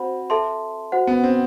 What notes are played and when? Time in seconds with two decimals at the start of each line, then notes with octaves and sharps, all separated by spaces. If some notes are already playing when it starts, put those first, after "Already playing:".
Already playing: C4 F#4 C5 F#5 B5
0.30 A4 E5 A5 C6
0.92 F#4 C5 F#5
1.07 B3
1.24 C4